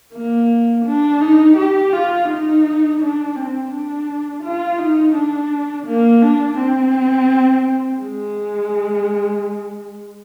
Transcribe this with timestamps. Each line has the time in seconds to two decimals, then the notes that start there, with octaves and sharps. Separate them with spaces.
0.13 A#3
0.86 D4
1.21 D#4
1.57 G4
1.92 F4
2.28 D#4
3.00 D4
3.36 C4
3.72 D4
4.44 F4
4.79 D#4
5.15 D4
5.87 A#3
6.22 D4
6.58 C4
8.01 G#3